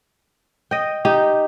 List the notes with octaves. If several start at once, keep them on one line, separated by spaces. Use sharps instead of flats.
D#5 G5
D#4 G4